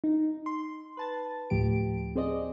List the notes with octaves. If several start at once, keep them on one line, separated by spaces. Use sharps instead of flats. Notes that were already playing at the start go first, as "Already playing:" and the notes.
D#4
C6
B4 A5 A6
D2 A2 F3 G4 D7
C4 G#4 C5 D5 D#5